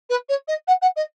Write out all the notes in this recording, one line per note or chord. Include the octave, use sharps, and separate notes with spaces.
B4
C#5
D#5
F#5
F#5
D#5